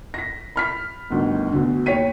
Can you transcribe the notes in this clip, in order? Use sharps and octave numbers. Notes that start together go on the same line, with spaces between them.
A#6 B6
B5 F6 B6
G1 D2 D#3
D2 B2 D3
D#2 C#5 G5 B6 D#7